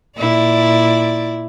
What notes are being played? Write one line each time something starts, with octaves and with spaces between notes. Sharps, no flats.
A#2 E4 D5